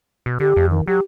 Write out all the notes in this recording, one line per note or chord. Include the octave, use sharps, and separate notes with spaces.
B2
D3 G4
F2
D#3
F#3 G4